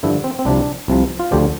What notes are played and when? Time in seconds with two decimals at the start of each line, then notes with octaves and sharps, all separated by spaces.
0.03 G2 D3 F3 E4
0.24 C4
0.39 C4
0.45 C2 C3 F3 D4
0.88 C2 C3 F3
1.20 F4
1.31 D2 D3 F3 G4